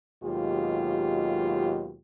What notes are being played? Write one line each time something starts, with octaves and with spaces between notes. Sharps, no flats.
D#2 B2 F#3 G#3 F4 G4